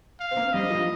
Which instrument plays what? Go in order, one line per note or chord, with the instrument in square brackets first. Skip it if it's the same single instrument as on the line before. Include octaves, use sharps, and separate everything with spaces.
[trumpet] F5
[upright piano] C4
A#3
[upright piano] G3 [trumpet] D#5
[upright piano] F3